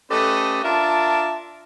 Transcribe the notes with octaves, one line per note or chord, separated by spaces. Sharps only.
A3 C#4 G4 A4 B4 D#5
D4 F4 A#4 E5 A5